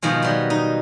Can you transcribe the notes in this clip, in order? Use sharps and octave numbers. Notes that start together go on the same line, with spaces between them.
B2 D#3 F3 G#3
F#3 G3
D#4